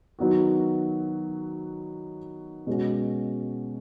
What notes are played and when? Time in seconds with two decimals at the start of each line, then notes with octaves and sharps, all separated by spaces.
0.19 D#3 F#3 B3 F#4
2.67 B2 G#3 C#4 F#4